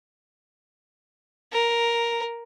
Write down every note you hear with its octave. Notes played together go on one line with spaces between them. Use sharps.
A#4